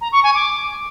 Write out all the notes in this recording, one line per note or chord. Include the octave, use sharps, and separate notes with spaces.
A#5
C#6
G#5
D6